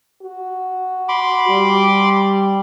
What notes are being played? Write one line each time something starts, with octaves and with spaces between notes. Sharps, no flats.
F#4
B5 C6 D6
G3